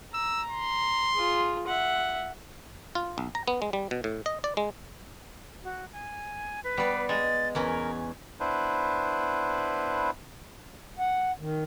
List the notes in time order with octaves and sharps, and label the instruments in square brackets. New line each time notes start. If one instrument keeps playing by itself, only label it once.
[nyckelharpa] A#5 [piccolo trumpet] E6
[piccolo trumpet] C6
[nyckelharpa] F4 G#4
E5 F#5
[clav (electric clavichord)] F4
B1
A#5
B3
G#3
G3
B2
A2
D#5
D5
G#3
[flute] F#4
G#5
B4
[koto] G3 [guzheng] B3 D5
[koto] G#3 [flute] A6
[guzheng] E2 C#4 B5 [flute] A#4
[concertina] B3 D4 E4 B4 C5
[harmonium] F#5
D#3